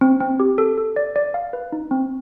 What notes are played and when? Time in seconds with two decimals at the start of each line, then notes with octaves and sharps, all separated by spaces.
0.01 C4
0.20 C4
0.40 G4
0.58 A4
0.78 A4
0.96 D5
1.16 D5
1.34 F5
1.53 B4
1.72 D#4
1.91 C4